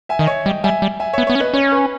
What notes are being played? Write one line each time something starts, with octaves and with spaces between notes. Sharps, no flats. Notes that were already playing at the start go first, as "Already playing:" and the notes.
E5 G#5
D#3 D#5
C#5 E5
G3 D#5 G5
G3 E5 G#5
G3
E5 G#5
B3 C#5 E5
B3 C#5
C#4
B4 D#5
C#4 C#5
B4